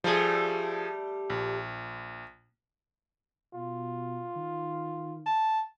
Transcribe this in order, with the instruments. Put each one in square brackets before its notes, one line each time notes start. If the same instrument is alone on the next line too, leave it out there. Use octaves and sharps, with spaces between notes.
[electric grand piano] F3 G#4 [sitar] G3 A3
[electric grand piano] A#1
[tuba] B2 [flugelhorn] F4
[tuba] D#3
[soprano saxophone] A5